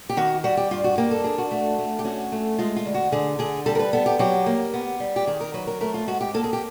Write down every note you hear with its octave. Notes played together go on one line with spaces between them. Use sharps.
G4
D#3 F#4
G3 F#4
G4
G2 F4
F#4
A#3 G4
A4
D4 G#4
F#4
A3
A3
G4
C#4 F#4
A3
G#3 F4
F4
D2
F#4
D3 G#4
D3 G#4
G3 A4
A#4
B4
B3 A4
G4
F#3 G4
A#3
B3
G3
G4
D#3 G#4
A#4
F#3 B4
A#4
A3 A#4
F4
G#2 F#4
G4
A#3 A4
G#4
G4